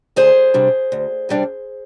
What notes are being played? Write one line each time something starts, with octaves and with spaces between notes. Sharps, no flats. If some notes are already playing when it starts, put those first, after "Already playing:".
D2 G#4 C5
C3 G3 D4
D2
C3 G3 D4